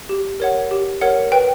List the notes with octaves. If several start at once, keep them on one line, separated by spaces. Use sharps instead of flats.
G4
A#4 C#5 F#5
G4
A#4 C#5 F#5
B4 G5